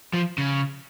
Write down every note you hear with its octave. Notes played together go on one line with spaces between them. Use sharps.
F3
C#3